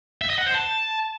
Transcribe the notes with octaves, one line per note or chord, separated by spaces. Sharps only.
E5
D#5
F#5
C5
A5